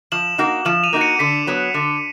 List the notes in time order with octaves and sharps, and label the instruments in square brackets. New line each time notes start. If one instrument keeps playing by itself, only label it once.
[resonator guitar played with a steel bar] F3 [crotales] E7 F#7
[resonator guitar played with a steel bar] A#3 D#4 F#4
[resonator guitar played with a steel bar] F3 [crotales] E7 F#7
[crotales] D#7 F7
[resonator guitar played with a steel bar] A#3 D#4 F#4
[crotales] C#7 D#7
[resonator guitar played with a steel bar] D3 [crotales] B6 C#7
[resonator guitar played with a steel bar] F#3 B3
D3